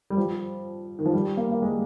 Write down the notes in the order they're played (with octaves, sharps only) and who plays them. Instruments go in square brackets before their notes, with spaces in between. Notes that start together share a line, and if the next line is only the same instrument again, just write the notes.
[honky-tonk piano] G3
F3
D#3
F3
G3
A#3
A#3
G#3